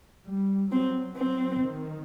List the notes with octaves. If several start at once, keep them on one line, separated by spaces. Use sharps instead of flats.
G3
F#3 C4
C4
D#3